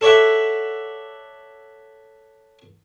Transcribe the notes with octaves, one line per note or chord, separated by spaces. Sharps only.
A4 C#5 D5 E5 F#5